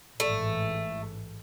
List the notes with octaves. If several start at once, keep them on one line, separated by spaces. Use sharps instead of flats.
A1 G#2 E3 A3